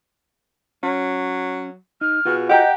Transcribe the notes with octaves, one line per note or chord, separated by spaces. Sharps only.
F#3 C#4
D#4 F6
B2 F4 F#4 G#4
G4 D#5 F#5 G5 A#5